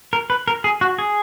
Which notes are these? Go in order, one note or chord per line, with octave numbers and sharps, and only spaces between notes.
A#4
B4
A#4
G#4
F#4
G#4